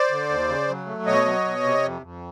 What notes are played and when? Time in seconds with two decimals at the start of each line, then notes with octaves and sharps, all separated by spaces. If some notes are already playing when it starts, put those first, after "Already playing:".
Already playing: C5 D5
0.11 D3
0.29 D#2
0.48 C#3
0.68 F#3
0.86 A3
1.06 B2 C#5 D#5
1.25 F#3
1.45 B2
1.63 C3
1.82 F2
2.02 F2